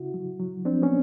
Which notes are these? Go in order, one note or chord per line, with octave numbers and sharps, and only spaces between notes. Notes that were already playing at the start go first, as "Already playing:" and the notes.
Already playing: C#3 E4 F#4
F#3
F#3
F3 C4 D4
B3 C#4